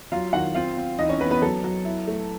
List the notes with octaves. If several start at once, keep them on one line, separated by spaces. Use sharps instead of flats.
F#3 F4 F5
D#3 F#4 F#5
C4 F4 F5
C4
E3 D#4 D#5
C#4 C#5
E3 B3 B4
B3 B4
F#3 A4
F#3
E4
A3